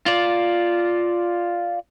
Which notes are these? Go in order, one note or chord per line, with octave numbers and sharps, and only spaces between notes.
F4 D5